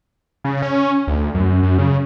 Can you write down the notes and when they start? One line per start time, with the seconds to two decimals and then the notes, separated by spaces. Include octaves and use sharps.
0.44 C#3
0.62 C#4
1.07 D2
1.34 F#2
1.63 F#2
1.79 C#3